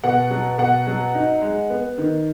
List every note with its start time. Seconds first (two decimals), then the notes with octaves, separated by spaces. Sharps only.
0.04 B2 F#5
0.31 F#3
0.58 B2 F#5
0.87 F#3
1.15 D#4
1.42 G#3
1.70 B3
1.98 D#3